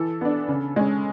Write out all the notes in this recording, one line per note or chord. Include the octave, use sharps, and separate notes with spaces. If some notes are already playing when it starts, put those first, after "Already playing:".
Already playing: E3 A4
B3 D4
C#3
G#3 C#4